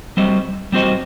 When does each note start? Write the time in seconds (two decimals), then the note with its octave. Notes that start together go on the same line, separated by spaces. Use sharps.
0.17 G3 C4 F#4 C5 D#5
0.72 G3 C4 F#4 C5 D#5